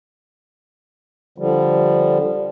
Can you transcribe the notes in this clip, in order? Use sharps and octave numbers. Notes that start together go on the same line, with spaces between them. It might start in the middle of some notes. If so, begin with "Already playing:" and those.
D3 F3 G3